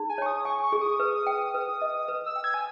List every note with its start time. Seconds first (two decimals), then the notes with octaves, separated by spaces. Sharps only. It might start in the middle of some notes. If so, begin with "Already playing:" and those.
Already playing: D#4 G#4
0.09 G#5
0.18 C#5 C#6
0.26 D#6
0.45 G#5 C#6
0.63 C#6
0.72 G#4
0.81 D#6
1.00 B4
1.27 G5
1.54 B4
1.82 D#5
2.08 B4
2.26 E6
2.36 G5
2.44 G#6
2.54 G#5